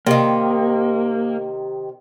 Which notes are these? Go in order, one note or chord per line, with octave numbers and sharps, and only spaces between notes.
C3 D#3 A#3